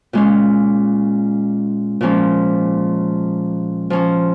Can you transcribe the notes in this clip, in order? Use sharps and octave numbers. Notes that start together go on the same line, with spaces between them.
A#2 G#3 C#4
A#2 F3 G#3 C#4
F3 C#4